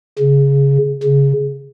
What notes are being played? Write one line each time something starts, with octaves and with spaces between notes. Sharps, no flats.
C#3
C#3